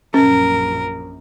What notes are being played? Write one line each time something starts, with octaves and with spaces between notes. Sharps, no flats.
A#1 F#2 C#4 A#4